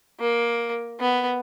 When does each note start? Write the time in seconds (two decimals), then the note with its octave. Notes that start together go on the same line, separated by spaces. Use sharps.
0.21 A#3
1.00 B3